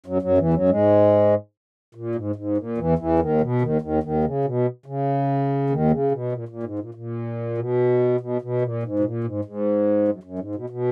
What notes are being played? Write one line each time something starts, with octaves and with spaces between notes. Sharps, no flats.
F#2 F#3
F#2 F#3
E2 E3
F#2 F#3
G#2 G#3
A#2
G#2
G#2
A#2
E2 E3
E2 E3
D#2 D#3
B2
D#2 D#3
D#2 D#3
D#2 D#3
C#3
B2
C#3
D#2 D#3
C#3
B2
A#2
A#2
G#2
A#2
A#2
B2
B2
B2
A#2
G#2
B2
A#2
G#2
G#2
F#2
F#2
G#2
B2
B2